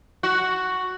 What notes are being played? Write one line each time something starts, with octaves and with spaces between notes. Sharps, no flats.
F#4